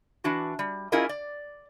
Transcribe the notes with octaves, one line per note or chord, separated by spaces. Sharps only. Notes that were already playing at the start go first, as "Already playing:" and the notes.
E3 D4 F#4
G3
C#4 E4 F4 G#4 A#4 D#5
D5